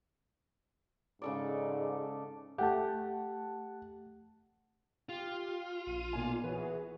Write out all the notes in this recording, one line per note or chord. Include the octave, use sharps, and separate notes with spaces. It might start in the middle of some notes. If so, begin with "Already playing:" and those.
G#2 C#3 A4 D5
A3 G4 F#5 A5
F4 G4
A#1 D#7
B1 A#2 G#5
E3 F#4 G#4 B4 C#5